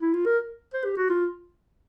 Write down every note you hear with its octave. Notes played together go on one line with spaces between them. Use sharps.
E4
F4
A#4
C5
G4
F#4
F4